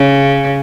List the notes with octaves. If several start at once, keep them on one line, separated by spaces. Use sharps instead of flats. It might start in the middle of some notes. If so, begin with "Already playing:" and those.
Already playing: C#3